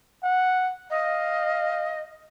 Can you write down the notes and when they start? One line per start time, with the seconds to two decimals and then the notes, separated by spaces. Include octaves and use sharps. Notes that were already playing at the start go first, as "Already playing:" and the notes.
0.24 F#5
0.90 D#5 F5